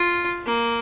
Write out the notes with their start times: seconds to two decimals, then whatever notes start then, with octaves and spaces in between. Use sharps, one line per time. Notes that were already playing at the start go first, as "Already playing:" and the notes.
Already playing: F4
0.46 A#3